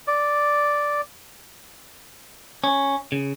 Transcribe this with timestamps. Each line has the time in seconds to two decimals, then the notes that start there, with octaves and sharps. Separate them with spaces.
0.08 D5
2.64 C#4
3.12 C#3